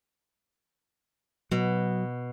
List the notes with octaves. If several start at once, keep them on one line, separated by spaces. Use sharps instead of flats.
B2 F#3